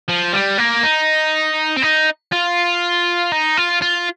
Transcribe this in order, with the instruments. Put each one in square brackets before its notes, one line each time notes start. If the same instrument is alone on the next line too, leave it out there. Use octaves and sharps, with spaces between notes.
[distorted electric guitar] F3
G3
A#3
D#4
C4
D#4
F4
D#4
F4
F4